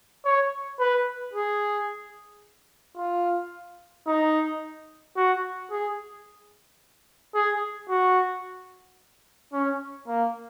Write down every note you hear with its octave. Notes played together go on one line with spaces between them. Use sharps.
C#5
B4
G#4
F4
D#4
F#4
G#4
G#4
F#4
C#4
A#3